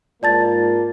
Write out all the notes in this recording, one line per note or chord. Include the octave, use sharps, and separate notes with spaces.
G#2 A#3 F4 D5 A5 A6